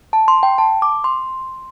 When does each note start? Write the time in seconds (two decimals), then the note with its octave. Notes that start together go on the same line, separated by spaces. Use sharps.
0.13 A5
0.28 C6
0.43 G5
0.58 A5
0.82 D6
1.04 C6